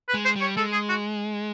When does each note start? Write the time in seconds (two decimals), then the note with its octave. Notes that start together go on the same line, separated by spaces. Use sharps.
0.08 B4
0.14 G#3
0.25 C5
0.36 G3
0.41 C#5
0.57 G#3 A4
0.72 G#4
0.89 F#4